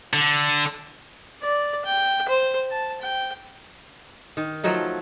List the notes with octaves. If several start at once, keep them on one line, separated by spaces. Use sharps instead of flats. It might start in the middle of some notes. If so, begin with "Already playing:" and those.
D3
D5
G5
C5
A5
G5
D#3
F3 F#3 A3 D#4